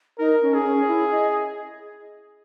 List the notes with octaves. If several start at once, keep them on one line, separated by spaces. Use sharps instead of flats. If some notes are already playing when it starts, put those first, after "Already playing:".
D#4 A#4
C#4
G#4
C#4
E4
D#5